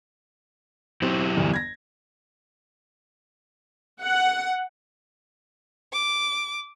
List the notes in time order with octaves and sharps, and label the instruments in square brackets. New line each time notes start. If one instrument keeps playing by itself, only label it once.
[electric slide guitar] F#3 E4 G4 [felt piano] C4
[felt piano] G1 E2
G#6 A#6
[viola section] F#5
[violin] D6